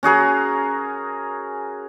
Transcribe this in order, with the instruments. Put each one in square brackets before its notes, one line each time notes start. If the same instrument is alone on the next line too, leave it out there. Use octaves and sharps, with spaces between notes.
[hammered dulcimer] C#4 F#4 G#4 A#4